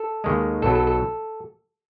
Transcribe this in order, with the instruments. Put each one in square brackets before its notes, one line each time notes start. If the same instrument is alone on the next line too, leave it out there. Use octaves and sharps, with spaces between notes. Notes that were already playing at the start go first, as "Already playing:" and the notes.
Already playing: [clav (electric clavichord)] A4
D#2 D#3 G#3
B1 B2 F#3 A4
A4
A4